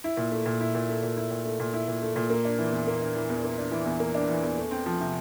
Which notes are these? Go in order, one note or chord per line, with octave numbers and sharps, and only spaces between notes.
E4
A#2
A3
A#2
E4
A#2
A3
A#2
E4
A#2
A3
A#2
E4
A#2
A3
A#2
A#3
D4
E3
E2
A#3
D4
E3
E2
A#3
D4
E3
E2
A#3
D4
E3
E2
A3
C4
F3
C3